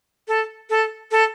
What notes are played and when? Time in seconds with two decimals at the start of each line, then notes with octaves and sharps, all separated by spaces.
0.28 A4
0.70 A4
1.11 A4